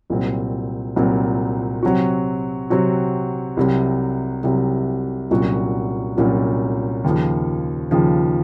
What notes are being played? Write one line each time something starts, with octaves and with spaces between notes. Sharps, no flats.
C2 A#2 F#3 C4
C2 A#2 F#3 C4
C3 F#3 C4 F#4
C3 F#3 C4 F#4
C2 C3 F#3
C2 C3 F#3
C2 A#2 F#3 C#4 F#4
C2 A#2 F#3 C#4 F#4
D#2 C#3 F3
D#2 C#3 F3